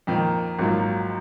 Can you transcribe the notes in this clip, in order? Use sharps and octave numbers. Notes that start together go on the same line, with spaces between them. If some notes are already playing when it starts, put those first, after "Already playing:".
F2 D#3 A#3
G#1 G#2 F#3 A#3 F4